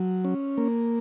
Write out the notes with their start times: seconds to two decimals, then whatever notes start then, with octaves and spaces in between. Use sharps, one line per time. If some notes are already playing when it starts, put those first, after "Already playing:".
Already playing: F#3
0.25 C#4
0.58 A#3